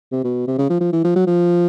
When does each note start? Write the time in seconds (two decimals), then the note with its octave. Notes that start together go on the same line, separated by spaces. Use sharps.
0.12 C3
0.24 B2
0.48 C3
0.58 C#3
0.70 F3
0.81 F3
0.92 E3
1.04 F3
1.16 F#3
1.27 F3